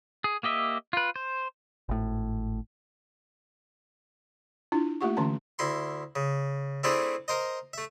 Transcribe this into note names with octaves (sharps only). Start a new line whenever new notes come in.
G#4
A#3 G4 D#5 E5
F4 B4
C5
G#1 A2
D4 E4 F4
A3 A#3 F4 G4 F#5 C#6
D3 E3 A3 C#4 A5 A#5
D2 E4 C6
C#3
A3 C4 D4 E4 G#4 A4
A#4 C5 D#5
A3 E5